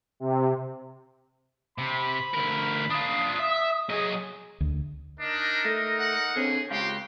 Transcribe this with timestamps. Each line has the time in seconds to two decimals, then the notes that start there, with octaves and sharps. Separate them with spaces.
0.20 C3
1.78 C3 B5
2.34 D2 A#4
2.90 D4 F4 D#6
3.39 E5
3.90 F#3 G#4 D#5
4.60 D2
5.20 D4 D#4 A#4 D#5
5.65 A3
6.00 F#5
6.36 D3 C4 C#4 G#4
6.71 C#3 G#3 F#4 G4 F5 C6